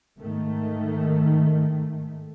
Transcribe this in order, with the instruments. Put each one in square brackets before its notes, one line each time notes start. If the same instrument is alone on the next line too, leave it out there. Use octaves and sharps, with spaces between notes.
[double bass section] G#2 D#3 A3